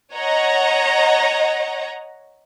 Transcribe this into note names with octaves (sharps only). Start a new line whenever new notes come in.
C#5 D#5 F#5 A#5